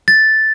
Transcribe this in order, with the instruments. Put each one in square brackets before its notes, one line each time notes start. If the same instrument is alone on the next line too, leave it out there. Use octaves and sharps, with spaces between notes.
[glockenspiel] A6